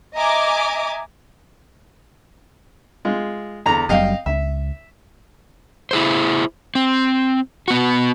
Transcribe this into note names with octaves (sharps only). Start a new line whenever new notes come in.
D#5 E5 G#5 A#5 D6 D#6
G#3 F4
E2 D3 A#5
F#1 F#2 G3 D#5 F5 G5
C#2 E5
E4 G#4 C5
C4
B3 F#4